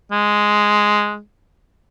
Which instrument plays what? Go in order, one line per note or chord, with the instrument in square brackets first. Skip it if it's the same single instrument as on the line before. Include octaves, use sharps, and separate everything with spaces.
[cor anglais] G#3